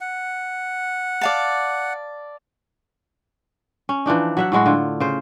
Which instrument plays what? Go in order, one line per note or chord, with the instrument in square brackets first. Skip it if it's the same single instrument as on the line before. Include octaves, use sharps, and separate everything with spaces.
[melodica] F#5
[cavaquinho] D5 F5 A5
[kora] C#4
E3 F3 D4 D#4
F#3 E5 F#5
A2 F#3 G#3 F#4
D3 F4
C#3 C5